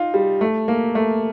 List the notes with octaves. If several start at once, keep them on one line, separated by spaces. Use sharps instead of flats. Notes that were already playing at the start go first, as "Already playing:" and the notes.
Already playing: D#4 F4
G3
A3
A#3
A3